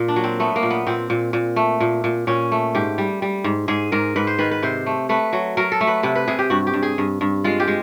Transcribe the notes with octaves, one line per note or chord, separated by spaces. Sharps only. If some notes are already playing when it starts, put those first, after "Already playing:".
Already playing: A#2
D4
F#3
C4
A3 B3
A#3
A#2
B3
A#2 C4
A#2
A#2
A3
A#2
A#2
A#2 C#4
A3
G#2 G4
G3
G3
G#2
G#2 G#4
G#2 A#4
G#2 B4
C5
D#3 B4
B4
C3 C5
A3
A3 B4
F#3
F#3 A#4
A4
A3
B4
C3 B4
B4
C3 G#4
G4
G2 F#4
G4
G2
G#4
G2
G2
G#3 F4
G4
G#3